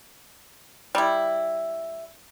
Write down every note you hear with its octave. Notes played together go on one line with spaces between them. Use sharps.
G3 E4